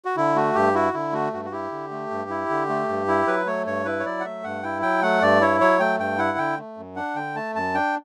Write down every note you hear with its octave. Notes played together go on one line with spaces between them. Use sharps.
F#4
D3 E4
A3 F#4
G2 G4
E4 F#4
D3 E4
A3 F#4
G2 F#4
F#4
E4 G4
D3
A3
G2
E4
D3
A3
G2
E4
F#3 B4
A3 C#5
G2 C#5
E4 B4
C#5
F#3 D5
F#5
A3 E5
G2 F#5
E4 G5
F#3 G5
A3 F#5
G2 D5
E4 C#5
F#3 C#5
A3 G5
G2 G5
E4 F#5
D3 G5
A3
F#2
D4 F#5
D3 G5
A3 A5
F#2 A5
D4 G5